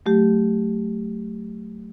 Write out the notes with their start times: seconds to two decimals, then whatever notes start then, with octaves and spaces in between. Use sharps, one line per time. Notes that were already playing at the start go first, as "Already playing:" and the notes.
0.06 F#3 A3 G4